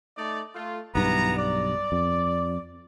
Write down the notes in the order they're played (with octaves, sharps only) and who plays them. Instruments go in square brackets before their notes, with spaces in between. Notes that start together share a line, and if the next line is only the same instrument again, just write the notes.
[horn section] A3 D#4 D5
A3 F4
[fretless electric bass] B1 G2 [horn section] E3 B3 A#5
[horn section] D5
[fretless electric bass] F2